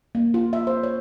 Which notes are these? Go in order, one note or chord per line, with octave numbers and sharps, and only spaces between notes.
A#3
F4
E5
C5
C#5